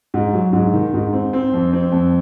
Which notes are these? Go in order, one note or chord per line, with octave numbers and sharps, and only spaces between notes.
G#2
F#3
G#2
D#3
G#2
C4
C4
F2
C4
F2